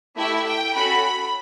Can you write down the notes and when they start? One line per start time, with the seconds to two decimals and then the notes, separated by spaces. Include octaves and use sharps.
0.17 A3 E4 G4 E5
0.46 G5
0.75 C#4 F#4 A4 B5